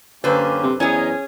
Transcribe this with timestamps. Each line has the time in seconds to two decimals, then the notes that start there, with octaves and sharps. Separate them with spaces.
0.24 F#2 D3 A#3 C#4 G4 B4 C5
0.63 C3
0.80 E2 C#4 G#4 D#5 G#5 A#5